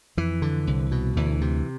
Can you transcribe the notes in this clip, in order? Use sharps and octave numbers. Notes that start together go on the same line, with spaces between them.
F2 E3
D3
C2
B2
D2 E3
C3